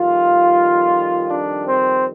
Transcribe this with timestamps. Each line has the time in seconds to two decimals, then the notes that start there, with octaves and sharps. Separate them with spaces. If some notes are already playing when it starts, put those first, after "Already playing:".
Already playing: F2 D#3 G3 F4
1.31 D4
1.66 C4